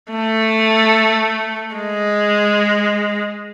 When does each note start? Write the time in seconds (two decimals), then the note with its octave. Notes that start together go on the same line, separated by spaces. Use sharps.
0.12 A3
1.76 G#3